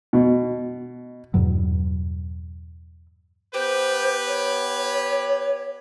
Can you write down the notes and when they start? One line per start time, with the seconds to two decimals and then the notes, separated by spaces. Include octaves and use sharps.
0.13 B2
1.34 E2 G2 B2 F#3
3.54 B3 G4 B4 C5
4.27 C#5